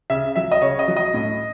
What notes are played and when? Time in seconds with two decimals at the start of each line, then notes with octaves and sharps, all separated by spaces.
0.10 C#3 E5
0.36 F#3 E5
0.52 D#5
0.62 C#3 C#5
0.79 D#5
0.88 F#3
0.96 D#5
1.14 A2